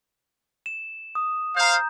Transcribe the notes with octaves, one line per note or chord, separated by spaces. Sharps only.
E7
D#6
C5 F5 A#5 G6